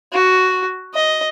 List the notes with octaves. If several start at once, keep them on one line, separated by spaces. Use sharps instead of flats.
F#4
D#5